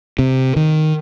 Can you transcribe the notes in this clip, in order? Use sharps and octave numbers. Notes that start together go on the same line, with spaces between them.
C3
D#3